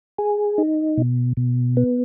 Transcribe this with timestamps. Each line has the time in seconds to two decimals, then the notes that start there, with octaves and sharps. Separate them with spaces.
0.18 G#4
0.58 D#4
0.97 B2
1.37 B2
1.77 B3